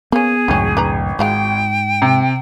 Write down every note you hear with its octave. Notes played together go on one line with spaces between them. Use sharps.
A#3 B3 C#4 G#4
G#1 C#2 F#2 A2 C#3 C#4
D4 B4 A#5
G#2 G#3 F4 F#4 G5
C3